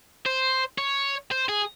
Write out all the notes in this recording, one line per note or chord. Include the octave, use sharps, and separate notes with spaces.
C5
C#5
C5
G#4